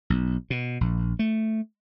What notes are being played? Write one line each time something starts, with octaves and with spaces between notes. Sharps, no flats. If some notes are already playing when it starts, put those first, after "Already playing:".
B1
B2
A#1
A3